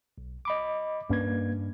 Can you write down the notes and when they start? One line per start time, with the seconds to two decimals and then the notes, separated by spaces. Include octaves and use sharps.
0.18 B1
0.45 D#5 B5 D6
1.10 G2 A#3 C#4 D4 B4 G#6